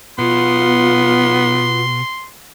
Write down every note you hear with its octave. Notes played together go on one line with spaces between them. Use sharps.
B2 B3 F4 C6